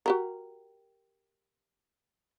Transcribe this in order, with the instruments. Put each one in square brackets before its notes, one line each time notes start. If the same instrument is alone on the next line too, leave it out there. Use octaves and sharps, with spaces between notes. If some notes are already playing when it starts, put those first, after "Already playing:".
[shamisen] F#4 G4 A#4